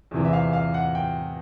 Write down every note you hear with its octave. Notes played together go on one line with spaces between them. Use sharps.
E2 C3 E3
E5
F5
F5
F#5
G5